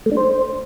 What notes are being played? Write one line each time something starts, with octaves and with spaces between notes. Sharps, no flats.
A3
D4
C5